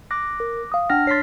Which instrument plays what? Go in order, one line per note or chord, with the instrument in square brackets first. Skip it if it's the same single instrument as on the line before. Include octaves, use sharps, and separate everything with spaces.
[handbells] D6 F#6 A#6
[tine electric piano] A#4
F5 D#6
[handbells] D4 F6 A#6 [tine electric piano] F#5 G5
[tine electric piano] C#5 A6 [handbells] C6 B6 C7